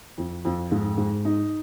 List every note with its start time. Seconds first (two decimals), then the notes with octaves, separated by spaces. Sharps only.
0.18 F2
0.45 F2
0.71 G#2
0.97 G#2
1.25 D#4